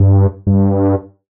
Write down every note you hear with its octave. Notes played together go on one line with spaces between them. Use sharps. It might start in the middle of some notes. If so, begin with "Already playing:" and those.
Already playing: G2
G2